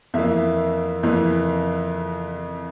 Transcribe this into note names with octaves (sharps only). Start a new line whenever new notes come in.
F2 E3 A#3 E5
F2 E3 A#3